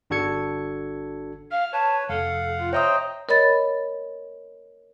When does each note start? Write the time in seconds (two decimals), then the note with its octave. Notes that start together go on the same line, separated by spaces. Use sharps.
0.10 G1 D4 F#4 A4 G#6 C#7
1.51 F5 F6
1.72 B4 C#5 A5
2.09 F1 A4 F5 F#5
2.58 F4
2.73 C5 C#5 D#5 E5 G5 A#5 D#6
3.29 A#4 C#5 D#5 B5 A6